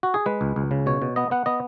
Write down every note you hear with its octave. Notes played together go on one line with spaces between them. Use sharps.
F#4
G#4
G#3 B4
C#2
C#2
C#3
B2 C#5
B2
B3 D#5
B3 F#5
B3 D#5